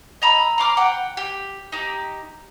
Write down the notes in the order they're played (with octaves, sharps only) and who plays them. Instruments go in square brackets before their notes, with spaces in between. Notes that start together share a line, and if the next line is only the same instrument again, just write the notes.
[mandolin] D#5 A#5 B5 E6
A#5 C6 D6 F6
F#5 G5
G4
D#4 G4